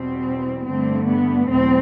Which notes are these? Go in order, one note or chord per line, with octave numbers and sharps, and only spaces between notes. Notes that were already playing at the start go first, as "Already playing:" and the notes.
Already playing: E2 B2 G3 B3 C4
G2 D3 A3 C4
B3
E2 B2 F#3 A3 C4